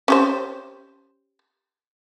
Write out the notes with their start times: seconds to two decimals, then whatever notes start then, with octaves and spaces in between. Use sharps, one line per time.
0.08 C#4 G4 C5